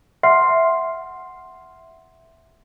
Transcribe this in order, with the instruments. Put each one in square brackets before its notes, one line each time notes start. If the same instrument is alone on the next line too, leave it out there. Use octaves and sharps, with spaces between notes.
[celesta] E5 F#5 C6 F6 C7